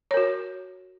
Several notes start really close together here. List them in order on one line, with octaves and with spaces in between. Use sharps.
C#5 A#4 F#4